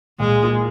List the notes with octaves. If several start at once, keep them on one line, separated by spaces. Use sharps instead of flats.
A#2 G#3
A#3 F4